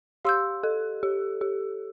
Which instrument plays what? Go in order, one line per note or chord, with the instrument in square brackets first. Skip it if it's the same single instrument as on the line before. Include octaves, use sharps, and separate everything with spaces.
[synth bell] G4 [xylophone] F5 C6 E6 G6
[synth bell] A4
G4
G4